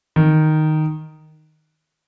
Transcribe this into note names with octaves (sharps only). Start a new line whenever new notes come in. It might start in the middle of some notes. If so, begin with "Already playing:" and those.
D#3